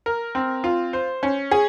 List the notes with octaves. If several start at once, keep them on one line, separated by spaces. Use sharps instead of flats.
A#4
C4
F4
C5
C#4
G#4